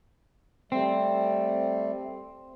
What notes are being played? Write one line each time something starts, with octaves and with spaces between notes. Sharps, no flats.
G3 A3 C4